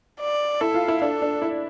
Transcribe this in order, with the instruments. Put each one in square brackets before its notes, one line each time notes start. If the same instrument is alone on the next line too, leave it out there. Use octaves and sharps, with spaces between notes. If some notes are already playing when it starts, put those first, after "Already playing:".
[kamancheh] D5
[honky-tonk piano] E4 [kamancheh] A4
[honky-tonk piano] F4
E4
[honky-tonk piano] D4 [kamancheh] A4
[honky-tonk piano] D4
E4